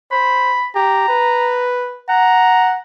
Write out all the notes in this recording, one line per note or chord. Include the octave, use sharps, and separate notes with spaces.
C5 B5
G4 A#5
B4
F#5 A#5